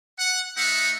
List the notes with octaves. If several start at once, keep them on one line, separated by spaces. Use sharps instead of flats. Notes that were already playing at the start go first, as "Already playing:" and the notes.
F#5
A3 D#4 E5 F#5